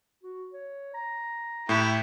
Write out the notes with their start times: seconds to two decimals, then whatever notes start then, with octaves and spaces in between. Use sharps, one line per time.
0.23 F#4
0.53 C#5
0.94 A#5
1.69 A2 E4 G4